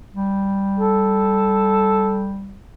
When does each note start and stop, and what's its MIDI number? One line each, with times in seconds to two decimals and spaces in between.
0.13 2.56 55
0.80 2.28 69